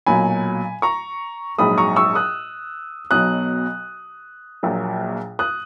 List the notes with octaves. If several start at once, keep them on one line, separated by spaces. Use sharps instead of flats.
B1 A#2 F#3 G#5 B5
A#5 C#6
A#1 G#2 F#3 B5 D#6
A#5 C#6
C#6 E6
D#6 F#6
B1 B2 F#3 D#6 F#6
A#1 A#2 F#3
D#6 F#6